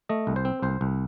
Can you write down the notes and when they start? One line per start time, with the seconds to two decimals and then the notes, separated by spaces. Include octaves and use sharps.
0.09 A3 D#5
0.27 C2
0.36 C5
0.45 C4
0.62 C2 C5
0.81 C2